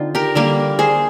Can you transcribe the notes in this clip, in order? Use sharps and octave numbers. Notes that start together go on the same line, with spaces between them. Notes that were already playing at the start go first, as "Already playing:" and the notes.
Already playing: D3 C4 D#4 F4
G4 A#4
D3 G3 A#3 G4 A#4
G#4 C5